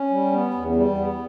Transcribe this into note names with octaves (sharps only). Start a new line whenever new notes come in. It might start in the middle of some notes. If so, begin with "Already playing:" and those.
Already playing: C#4
G3
B3
E2
G3
B3